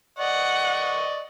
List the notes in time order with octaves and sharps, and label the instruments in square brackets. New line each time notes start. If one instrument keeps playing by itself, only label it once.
[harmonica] D5 D#5 C#6 [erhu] F#5